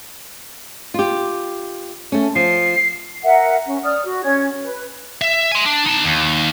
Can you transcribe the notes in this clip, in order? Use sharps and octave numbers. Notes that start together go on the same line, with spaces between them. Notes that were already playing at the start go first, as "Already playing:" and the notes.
F4 G4
A3 C#4
F3 C7
A#4 E5 F#5
C#4
D5 D#6 F6
F#4
C#4 G#6
B4
E5
G#5 C6
D4
D#4 A5
D#2